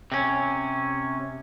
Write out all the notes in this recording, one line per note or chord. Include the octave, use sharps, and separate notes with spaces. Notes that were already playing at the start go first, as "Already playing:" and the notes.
C3 C#4